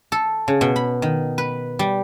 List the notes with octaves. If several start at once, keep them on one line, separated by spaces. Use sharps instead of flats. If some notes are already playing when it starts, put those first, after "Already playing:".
A4
C#3
B2
B5
D#3
B4
G3